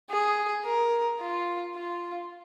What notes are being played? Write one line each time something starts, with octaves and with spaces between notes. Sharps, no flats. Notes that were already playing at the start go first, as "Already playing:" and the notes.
G#4
A#4
F4
F4